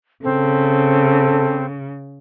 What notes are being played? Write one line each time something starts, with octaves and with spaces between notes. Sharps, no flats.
C#3 C4 A4